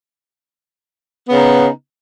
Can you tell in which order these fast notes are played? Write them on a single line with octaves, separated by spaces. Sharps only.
B3 C#3 D#4